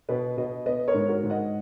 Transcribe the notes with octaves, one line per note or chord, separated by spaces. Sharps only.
B2 B4 D#5
B2 B4 D#5
B3 B4 D#5
A#4 C#5
G#2
F#4 A#4
G#2
D#5 F#5